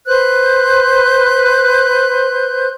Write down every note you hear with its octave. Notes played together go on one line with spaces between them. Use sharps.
B4 C5 F#6 G6